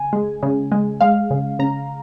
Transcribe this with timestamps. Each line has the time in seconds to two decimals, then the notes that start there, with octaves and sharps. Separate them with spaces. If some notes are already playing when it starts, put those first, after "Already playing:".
Already playing: C#3 G#5
0.13 G#3
0.43 C#3
0.72 G#3
1.01 G#3 F5
1.31 C#3
1.59 C#3 A#5